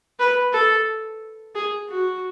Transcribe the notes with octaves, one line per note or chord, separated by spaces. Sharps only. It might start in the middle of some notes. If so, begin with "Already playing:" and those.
B4
A4
G#4
F#4